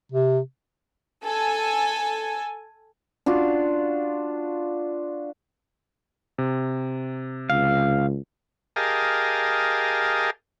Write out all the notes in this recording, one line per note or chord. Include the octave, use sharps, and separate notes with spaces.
C3
A4 G#5
D4 F4 F#4
C3
C#2 F5
G4 G#4 A#4 D#5 F5 A5